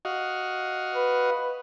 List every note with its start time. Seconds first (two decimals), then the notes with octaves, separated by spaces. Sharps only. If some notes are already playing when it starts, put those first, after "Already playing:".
0.05 F#4 D#5 F5
0.94 B4